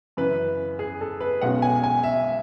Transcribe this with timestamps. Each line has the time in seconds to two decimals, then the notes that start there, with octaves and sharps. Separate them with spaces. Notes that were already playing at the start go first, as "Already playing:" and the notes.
0.17 F#2 C#3 E3 B4
0.79 G#4
1.01 A4
1.21 B4
1.42 B1 B2 G#3 C#4 F#5
1.62 G#5
1.84 G#5
2.03 E5